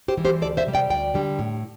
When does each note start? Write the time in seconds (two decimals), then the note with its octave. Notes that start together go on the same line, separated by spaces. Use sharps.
0.08 G4 C5
0.17 E3 G3
0.25 G4 C5
0.41 D2 A4 D5
0.57 C5 E5
0.67 C3 G3
0.73 D5 G5
0.90 D2 D5 G5
1.14 D3 G3
1.39 A2